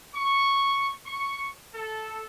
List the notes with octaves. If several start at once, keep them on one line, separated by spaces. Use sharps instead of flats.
C#6
C#6
A4